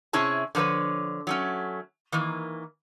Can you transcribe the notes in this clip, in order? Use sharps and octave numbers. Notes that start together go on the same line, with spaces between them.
C3 C#4 E4 G#4 A5
D3 F3 A4 B4 C#5
F#3 A3 C#4
D#3 E3 A#3